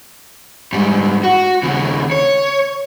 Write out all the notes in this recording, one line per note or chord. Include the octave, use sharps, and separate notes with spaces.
G#2 G3
F#4
D#2 C#3
C#5